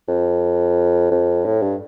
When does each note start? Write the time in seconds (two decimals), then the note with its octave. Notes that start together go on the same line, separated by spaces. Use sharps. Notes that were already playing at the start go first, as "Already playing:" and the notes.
0.08 F2
1.11 F2
1.46 A2
1.62 G2